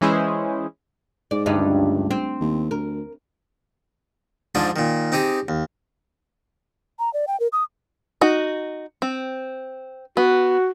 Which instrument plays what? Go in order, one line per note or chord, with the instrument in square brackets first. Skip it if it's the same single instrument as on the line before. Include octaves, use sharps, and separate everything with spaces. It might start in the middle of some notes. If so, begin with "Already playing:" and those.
[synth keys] E3 G#3 C#4 E4 G#4 C5
[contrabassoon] G#2 [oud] D5
[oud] D2 G2 D#4
[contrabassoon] C#2
[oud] C4
[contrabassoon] D#2
[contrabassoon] D2 [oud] A#4
[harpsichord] G#2 F3 D4 F4 G#4
A#2 D#3
C4 D#4 G4 G#4
D#2
[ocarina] A#5
D5
G5
A#4
D#6
[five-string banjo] D#4 F#4
C4
[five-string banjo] B3 [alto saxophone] F#4